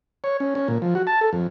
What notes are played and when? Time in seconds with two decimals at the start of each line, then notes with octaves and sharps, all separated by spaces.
0.24 C#5
0.40 C#4
0.55 C#4
0.68 A#2
0.82 F3
0.95 F#4
1.07 A5
1.21 A4
1.33 F2